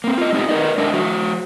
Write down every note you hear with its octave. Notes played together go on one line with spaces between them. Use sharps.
A#3 C4
F4 D#5
G#3 B3 C4 D#4 F4 G4
A#4 B4 D5 D#5
G#3 D4 A#4 D#5 E5 A5
F3 F#4 C5